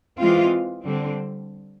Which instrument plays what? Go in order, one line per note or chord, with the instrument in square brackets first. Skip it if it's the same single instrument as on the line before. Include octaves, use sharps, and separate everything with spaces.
[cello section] E3 G#3 C4 F4
D3 G3 C4